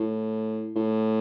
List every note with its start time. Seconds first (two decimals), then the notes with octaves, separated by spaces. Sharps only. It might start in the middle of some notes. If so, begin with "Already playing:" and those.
Already playing: A2
0.75 A2